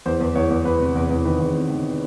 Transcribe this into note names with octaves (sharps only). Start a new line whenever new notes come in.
E2 C5
E2
E2 C#5
E2
E2 B4
C3
E2
E2
D#3 B4
E2
C3
D#3